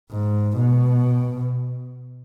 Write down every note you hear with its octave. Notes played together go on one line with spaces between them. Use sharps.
G#2
B2